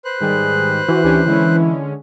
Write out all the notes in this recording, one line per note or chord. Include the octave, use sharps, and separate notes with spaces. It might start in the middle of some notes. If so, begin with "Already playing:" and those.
B4 C5 F#6
G#2 D#3 G3 G#4
E3 F#4
D2 C#4 D4 G4
D3 G#3 C#4 E4